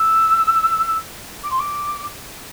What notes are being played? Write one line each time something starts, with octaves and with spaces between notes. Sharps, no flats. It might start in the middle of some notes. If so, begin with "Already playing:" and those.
Already playing: E6
D6
C6
D6